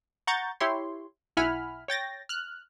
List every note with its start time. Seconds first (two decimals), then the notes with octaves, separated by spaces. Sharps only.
0.27 F#5 A#5 C#6 G6 A6
0.60 E4 G4 C#5 C6
1.37 B1 E4 F#5 G#5 B5 F6
1.88 C#5 G5 A6 A#6
2.29 F6 F#6